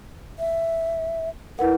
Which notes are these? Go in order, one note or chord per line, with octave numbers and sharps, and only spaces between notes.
E5
E4 A#4 B4 F#5